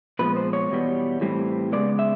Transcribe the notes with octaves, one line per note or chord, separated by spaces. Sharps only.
A#2 F3 G#3 B3 B4
C5
C#5
E2 B2 G3 B3
A2 E3 G3 C4
C#3 F3 G#3 B3 D5
E5